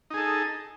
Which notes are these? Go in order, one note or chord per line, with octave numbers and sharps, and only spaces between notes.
D#4 G#4 A4